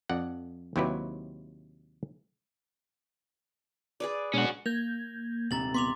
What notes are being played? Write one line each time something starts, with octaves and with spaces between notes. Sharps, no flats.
F2 D5 F#5
D#2 C3 F#3 E4 G4 B4
G#4 B4 D5
B2 G#3 C#4 D4 F#4
A#3 G6 G#6 F7
D#1 C3 A#5 A6 F#7
B3 C6 D6 F7